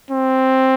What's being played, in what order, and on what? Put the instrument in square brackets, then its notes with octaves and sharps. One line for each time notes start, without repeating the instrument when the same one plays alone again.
[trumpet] C4